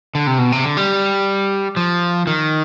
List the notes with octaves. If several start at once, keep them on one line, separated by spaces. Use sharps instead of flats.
D3
C3
B2
C3
D3
G3
F3
D#3